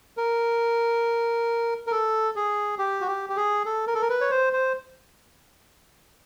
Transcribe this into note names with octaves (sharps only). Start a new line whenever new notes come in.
A#4
A#4
A4
G#4
G4
F#4
G4
G4
G#4
A4
A#4
A4
A#4
B4
C#5
C5
C5